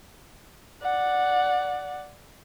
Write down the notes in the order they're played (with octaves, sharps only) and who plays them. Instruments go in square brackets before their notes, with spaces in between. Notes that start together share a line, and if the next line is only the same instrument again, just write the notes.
[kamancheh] D5 F#5